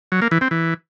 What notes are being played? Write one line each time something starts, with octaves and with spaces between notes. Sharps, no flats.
F#3
A#3
E3
C4
E3